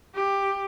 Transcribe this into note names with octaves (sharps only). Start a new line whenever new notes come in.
G4